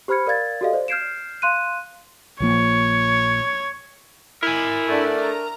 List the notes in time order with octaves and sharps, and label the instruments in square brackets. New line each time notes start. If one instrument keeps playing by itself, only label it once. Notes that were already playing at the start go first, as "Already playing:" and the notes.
[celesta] G4 C5 B5 F6 G#6 C#7
A#4 D5 F5 G#6 A6
F#4 G4 A4 D5 D#5 F5
C5 D5
F6 G6 G#6 C7 D7 E7
F5 C6 F#6 D#7
[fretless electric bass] A#1 F3 A#3 [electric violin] C#5
[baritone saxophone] E4 [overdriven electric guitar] A#4 G#5
[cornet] A3 [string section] D4 D5 F#5
[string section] A#5